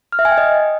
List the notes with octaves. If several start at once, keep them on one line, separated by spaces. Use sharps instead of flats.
F6
E5
G#5
G5
D#5